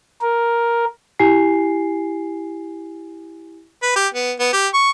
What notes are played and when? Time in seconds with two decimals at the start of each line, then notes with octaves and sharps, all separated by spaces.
0.22 A#4
1.19 E4 G4 G#5 C7
3.83 B4
3.96 G4
4.14 B3
4.39 B3
4.53 G4
4.74 C#6